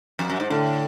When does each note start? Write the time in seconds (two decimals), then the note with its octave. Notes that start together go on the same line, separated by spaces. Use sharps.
0.19 F2
0.30 F#2
0.40 G#2
0.50 A2 D3